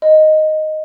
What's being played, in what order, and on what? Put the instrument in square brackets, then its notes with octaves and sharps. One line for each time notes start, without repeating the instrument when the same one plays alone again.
[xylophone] D#5